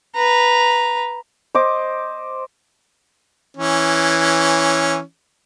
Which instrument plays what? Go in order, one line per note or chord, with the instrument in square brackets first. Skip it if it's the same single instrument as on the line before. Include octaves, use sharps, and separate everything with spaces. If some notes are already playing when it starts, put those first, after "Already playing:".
[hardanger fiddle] B4 A#5
[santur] C5 D#5 D6
[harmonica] E3 C#4